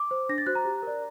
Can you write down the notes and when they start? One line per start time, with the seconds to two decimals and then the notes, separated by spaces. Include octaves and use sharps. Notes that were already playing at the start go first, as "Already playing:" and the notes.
Already playing: D6
0.11 C5
0.29 D4 A#6
0.38 A6
0.46 F#4 C5 F#6
0.55 A#5
0.65 G4
0.83 A#4 D5